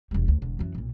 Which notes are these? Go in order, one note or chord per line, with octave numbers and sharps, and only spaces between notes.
E1 G3
D2
E1 D3
F#2 E3
B1 A#2